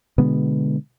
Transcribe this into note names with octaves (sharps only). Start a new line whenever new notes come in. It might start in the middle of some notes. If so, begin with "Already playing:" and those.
B2 D3 G#3 B3